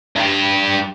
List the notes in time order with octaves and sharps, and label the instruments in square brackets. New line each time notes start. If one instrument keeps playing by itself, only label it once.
[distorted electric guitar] G2 G4